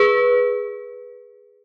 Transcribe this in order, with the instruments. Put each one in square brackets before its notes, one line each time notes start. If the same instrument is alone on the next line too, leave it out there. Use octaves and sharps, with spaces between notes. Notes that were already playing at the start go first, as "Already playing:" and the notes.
Already playing: [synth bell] G#4 B4